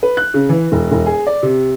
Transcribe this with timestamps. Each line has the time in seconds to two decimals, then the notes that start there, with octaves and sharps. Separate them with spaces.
0.03 B4
0.17 F#6
0.34 C#3
0.49 E3
0.72 E1
0.91 E1
1.06 G#4
1.27 D5
1.43 C3